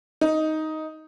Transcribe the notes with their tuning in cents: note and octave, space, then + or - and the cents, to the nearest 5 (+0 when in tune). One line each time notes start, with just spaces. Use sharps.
D#4 +5